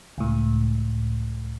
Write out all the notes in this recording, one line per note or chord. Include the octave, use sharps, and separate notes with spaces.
C#2 A2